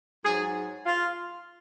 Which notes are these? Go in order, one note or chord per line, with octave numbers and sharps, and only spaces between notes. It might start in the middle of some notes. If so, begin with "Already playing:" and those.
G#2 F#3 G#4
F4